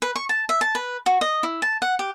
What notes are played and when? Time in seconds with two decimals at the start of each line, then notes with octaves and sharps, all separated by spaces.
0.02 B4
0.16 C#6
0.29 A5
0.49 E5
0.61 A5
0.75 B4
1.06 F#4
1.21 D#5
1.43 E4
1.62 A5
1.82 F#5
1.99 G4